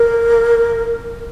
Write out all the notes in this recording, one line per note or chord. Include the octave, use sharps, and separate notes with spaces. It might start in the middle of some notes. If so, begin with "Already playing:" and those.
Already playing: A#4